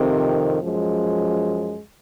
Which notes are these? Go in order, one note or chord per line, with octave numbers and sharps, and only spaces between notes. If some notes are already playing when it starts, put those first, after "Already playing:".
Already playing: F2 C3 D#3
F#2 F3 G#3